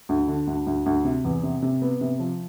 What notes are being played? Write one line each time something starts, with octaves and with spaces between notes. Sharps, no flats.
D2
D3
D2
D2
D2
C3
E2
C3
C3
B3
C3
F3